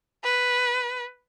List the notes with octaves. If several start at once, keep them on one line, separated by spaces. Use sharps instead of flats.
B4